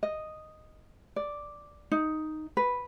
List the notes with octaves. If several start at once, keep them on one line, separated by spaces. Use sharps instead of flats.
D#5
D5
D#4
B4